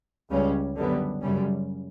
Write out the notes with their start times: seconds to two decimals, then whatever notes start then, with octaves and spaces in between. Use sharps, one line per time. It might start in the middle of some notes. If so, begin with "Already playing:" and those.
0.30 C#2 C#3 G3 C#4
0.76 F#2 D3 G3 B3
1.22 F#2 C#3 G3 C#4